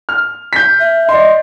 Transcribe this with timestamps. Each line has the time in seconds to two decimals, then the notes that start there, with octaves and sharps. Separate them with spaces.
0.09 F6
0.53 G6 B6
0.80 E5
1.09 D5 D#5 C6